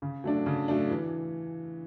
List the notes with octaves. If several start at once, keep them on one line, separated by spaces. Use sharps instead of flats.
C#3
F#3 A3 D4
C#3
F#3 A3 D4
E3